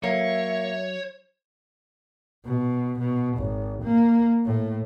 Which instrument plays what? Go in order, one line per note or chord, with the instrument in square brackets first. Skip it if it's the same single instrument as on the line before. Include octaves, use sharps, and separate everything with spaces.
[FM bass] F#3 [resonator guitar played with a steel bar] A#3 [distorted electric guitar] C#5 [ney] E5
[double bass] B2
B2
G#1
A#3
A2